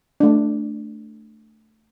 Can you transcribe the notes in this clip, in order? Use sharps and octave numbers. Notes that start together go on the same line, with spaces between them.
A3 D4